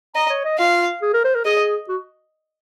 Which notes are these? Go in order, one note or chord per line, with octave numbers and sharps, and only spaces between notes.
D#5 A#5
C#5
D#5
F4 F5
G#4
A#4
C5
A#4
G#4 D#5
F#4